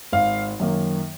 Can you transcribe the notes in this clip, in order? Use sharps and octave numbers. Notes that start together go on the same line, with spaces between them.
G#1 F5
F#2 D#3 A#3